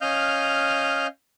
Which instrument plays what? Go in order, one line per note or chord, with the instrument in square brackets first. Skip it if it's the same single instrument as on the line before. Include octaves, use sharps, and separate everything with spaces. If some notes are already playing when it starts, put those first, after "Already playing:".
[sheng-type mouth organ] C#4 D#5 F5 F6 G6